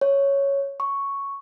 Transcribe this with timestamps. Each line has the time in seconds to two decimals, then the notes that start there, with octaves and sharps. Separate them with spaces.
0.01 C#5
0.80 C#6